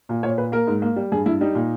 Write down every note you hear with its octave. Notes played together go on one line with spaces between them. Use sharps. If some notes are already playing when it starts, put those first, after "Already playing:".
A#2
A#2 C#5
A#2 B4
A#3 A#4
G#2
A#3
G3
G2 G#4
G2 E4
G3 D#4
A#2